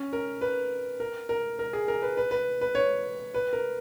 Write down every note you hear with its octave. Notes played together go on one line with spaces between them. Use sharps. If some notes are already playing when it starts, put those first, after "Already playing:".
Already playing: C#4
A#4
B4
A#4
A#4
A#4
G#4
A#4
B4
B4
B4
B4
C#5
B4
A#4